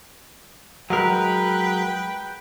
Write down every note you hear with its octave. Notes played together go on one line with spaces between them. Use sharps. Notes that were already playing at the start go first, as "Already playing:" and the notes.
F#3 G#3 A#4 B4 G5